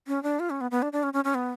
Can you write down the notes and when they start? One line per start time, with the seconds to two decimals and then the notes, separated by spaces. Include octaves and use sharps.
0.07 C#4
0.23 D4
0.40 F4
0.50 C#4
0.61 B3
0.71 B3
0.82 D4
0.93 D4
1.03 C#4
1.13 C#4
1.24 C#4
1.35 B3